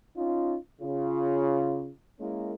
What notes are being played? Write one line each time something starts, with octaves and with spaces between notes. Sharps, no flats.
C#4 D#4 F4
C#3 F4
G#3 A#3 C#4 E4 A#4